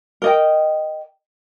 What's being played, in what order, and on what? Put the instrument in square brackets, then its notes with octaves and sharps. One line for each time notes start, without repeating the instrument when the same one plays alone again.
[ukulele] A#4 D#5 G5